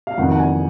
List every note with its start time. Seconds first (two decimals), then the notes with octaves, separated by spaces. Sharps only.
0.07 F5
0.17 F1 F2 D#3 F#5
0.32 F#5
0.39 G#5